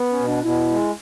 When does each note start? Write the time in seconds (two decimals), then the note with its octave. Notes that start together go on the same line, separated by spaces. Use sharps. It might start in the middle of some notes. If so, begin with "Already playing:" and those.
Already playing: B3
0.11 C#4
0.19 B2
0.27 D4
0.44 B2 E4
0.70 G#3